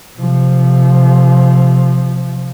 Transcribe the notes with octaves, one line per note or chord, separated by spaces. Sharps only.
C3 F3